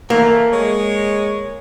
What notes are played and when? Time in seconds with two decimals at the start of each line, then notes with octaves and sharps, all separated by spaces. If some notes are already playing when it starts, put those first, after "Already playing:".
0.10 E3 A3 A#3
0.53 G#3 C#5